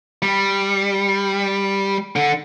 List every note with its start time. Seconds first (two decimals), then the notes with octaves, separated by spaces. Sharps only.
0.22 G3
2.16 D3